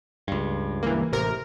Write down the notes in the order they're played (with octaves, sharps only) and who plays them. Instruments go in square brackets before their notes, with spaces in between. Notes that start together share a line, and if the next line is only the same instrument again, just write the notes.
[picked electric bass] C#2 G2
[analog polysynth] E3 A#3
[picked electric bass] A1 [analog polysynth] C3 A#4